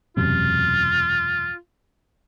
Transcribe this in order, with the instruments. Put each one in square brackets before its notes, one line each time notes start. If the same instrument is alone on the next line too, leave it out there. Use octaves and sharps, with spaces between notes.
[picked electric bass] E1 F#2 C3 [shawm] F4